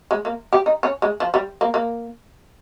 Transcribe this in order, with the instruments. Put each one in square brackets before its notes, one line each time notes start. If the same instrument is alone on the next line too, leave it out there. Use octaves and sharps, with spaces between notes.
[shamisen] G#3
A#3
G4
D#4
C#4
G#3
F3
G3
A#3
A#3